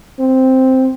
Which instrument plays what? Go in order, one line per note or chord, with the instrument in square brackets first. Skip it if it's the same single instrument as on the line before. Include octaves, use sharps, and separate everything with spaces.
[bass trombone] C4